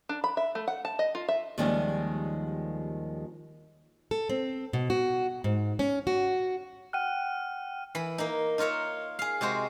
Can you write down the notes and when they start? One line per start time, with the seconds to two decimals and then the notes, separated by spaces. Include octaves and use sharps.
0.09 D4
0.24 B5
0.37 E5
0.55 A3
0.68 F#5
0.85 A5
0.99 D#5
1.15 F4
1.28 E5
1.58 D#2 D#3 F3 G3 G#3 C#4
4.11 A4
4.29 C4
4.73 B2
4.90 F#4
5.44 G#2
5.79 C#4
6.07 F#4
6.93 F#5 G5 F6 F#6 D#7
7.95 E3 B5
8.18 A#3 D#4
8.58 D#4 F4 A#4 C#5 E5
9.19 G#4 F5
9.41 C3 G#3 F#4 C5